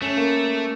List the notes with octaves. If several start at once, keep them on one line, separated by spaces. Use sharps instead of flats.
A3 C#4
A#3